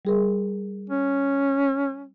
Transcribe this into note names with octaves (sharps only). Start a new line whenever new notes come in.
G3 G#4 A#4
C#4